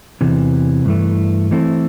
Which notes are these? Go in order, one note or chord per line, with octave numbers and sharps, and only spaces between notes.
E2 C3 E3
G2 E3 A3
E3 A3 C4 E4 A4